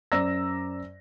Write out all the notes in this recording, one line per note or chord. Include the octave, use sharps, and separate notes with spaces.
F#2 C5 D5 A#5 E6 A#6